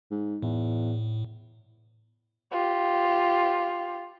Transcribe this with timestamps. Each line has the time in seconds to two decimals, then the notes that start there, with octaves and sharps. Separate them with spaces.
0.11 G#2
0.42 E2 A2
2.52 F4 G4